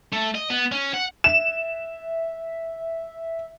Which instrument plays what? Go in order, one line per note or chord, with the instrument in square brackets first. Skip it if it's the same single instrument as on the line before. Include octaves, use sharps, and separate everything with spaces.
[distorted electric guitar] A3
D#5
B3
C#4
F#5
[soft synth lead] E5 [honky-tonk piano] E7